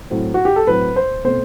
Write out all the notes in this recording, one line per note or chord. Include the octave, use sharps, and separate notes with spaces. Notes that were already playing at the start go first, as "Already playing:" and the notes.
A2 F#3 C4
F#4
G4
A4
A2 F#3 C4 B4
C5
B2 A3 C4 C5